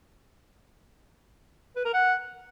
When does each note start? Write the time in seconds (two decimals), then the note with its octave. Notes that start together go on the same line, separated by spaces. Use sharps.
1.76 B4
1.85 A#4
1.93 F#5